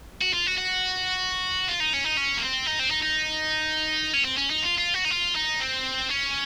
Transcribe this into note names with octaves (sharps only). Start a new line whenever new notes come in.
F#4
F4
F#4
F#4
F4
D#4
C#4
D#4
C#4
A#3
C4
D#4
C4
D#4
D#4
C#4
C4
C#4
D#4
F4
F4
F#4
D#4
F4
D#4
C4
C#4